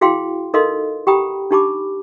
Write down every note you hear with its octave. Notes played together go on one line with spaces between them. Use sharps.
E4 F#4 G#4 F5 G5 C6
D#4 A4 A#4 D#5 F5 C6
G4 F#5 G5 A#5 B5 D#6
D4 D#4 G4 A5 B5 D6